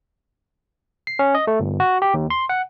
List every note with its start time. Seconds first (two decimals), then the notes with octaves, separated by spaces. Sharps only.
1.07 C7
1.19 C#4
1.35 D#5
1.47 A3
1.60 G1
1.80 F#4
2.02 G4
2.14 D#2
2.30 C6
2.49 F#5